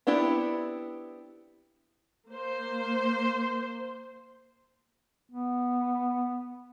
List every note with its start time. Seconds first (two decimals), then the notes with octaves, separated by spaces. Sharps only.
0.07 B3 C4 D4 E4 G4
2.29 A#3 C5
5.31 B3